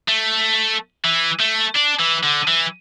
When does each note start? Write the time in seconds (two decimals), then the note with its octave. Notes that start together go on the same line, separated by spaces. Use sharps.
0.09 A3
1.05 E3
1.40 A3
1.76 D4
2.00 E3
2.24 D3
2.48 E3